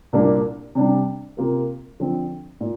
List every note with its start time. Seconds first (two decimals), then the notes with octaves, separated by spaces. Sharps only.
0.13 C2 A#2 A#3 D4 A#4
0.75 C3 G3 D4
1.37 C3 A#3 F4 A#4
2.00 D3 F3 C4
2.61 A#2